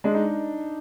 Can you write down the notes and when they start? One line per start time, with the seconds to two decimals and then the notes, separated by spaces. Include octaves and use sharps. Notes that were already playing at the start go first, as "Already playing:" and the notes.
0.04 G#3 D4
0.15 D#4